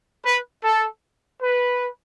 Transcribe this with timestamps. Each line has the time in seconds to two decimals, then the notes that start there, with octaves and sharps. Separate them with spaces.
0.24 B4
0.63 A4
1.41 B4